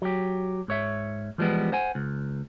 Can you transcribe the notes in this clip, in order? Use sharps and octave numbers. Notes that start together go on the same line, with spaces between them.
F#3 G4
G#2 C#5 E5
E3 F3 G3 G#3 B3
C5 F#5 G#5
C#2